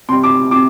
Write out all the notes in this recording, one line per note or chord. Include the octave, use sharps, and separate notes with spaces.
C3 G3 C6
D6
C3 D6